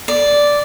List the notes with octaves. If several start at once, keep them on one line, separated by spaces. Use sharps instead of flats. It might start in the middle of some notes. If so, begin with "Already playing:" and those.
D5